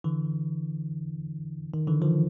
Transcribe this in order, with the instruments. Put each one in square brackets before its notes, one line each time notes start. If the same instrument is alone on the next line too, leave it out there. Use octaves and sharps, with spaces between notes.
[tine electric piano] D3 E3
D#3
D3 E3
D#3 F3